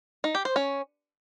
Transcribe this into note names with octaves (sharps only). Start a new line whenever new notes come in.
D#4
G4
C5
C#4